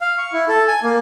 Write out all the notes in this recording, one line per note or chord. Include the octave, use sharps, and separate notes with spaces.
F5
C#6
E4
A4
G#5
A#3